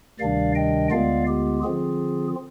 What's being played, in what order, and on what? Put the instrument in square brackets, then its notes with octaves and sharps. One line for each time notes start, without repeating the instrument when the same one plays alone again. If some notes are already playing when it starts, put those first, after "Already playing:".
[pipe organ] D2 C3 D#3 G3 D4 D5 F5
D#5 G5
D2 D3 G#3 B3 F4 D5 F5
G4
D3 F3 C4 F4 G#4